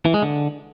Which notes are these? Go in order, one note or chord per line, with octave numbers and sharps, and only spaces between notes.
E3
G#3
D3